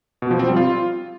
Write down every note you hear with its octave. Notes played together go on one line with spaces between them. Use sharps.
B2
F3
C4
G3
F4